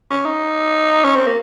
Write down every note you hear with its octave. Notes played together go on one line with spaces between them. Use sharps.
C#4
D#4
C#4
C4
A#3